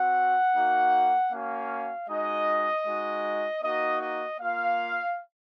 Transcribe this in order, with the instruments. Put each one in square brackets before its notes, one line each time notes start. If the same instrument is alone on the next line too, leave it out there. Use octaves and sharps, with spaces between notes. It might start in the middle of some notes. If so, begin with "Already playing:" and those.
Already playing: [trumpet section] C4 F#4 F#5
A#3 D#4 F#4
A#3 C#4 F#4 F5
G#3 D#4 F#4 D#5
G#3 D#4 F#4
A#3 D#4 F#4 D#5
D#5
A#3 F4 F5